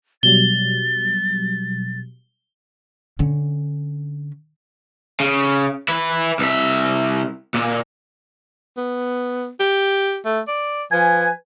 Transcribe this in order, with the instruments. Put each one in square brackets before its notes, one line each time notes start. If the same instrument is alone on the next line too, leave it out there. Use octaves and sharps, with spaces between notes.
[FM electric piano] B2 F#3 G3 [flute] A6 [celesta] G7
[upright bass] D3 C#4
[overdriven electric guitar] C#3
E4 B4
C2 E5
A#2
[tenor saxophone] B3
G4
A3
D5
[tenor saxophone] F3 [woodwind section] B4 G#5